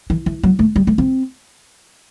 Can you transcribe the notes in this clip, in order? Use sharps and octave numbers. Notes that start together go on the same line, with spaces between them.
E3
E3
F#3
A3
G3
A3
C4